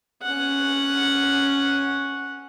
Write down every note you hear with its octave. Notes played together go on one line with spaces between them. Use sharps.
C#4 F#5